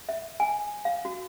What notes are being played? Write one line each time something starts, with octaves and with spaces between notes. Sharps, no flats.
E5
G#5
F5
F#4